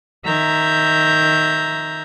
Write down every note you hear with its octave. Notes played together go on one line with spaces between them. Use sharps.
D#3 E5 A#5 G6 G#6